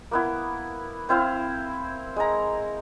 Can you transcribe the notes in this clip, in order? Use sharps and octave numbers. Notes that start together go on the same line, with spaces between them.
A#3 B3 E4
C4 E4 C5 F5
G#3 A#5